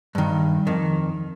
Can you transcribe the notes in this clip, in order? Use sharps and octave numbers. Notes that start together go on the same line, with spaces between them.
G2 D#3
F2 D#3